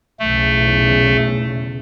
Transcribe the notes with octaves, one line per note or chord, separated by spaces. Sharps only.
B1 E2 C#3 A3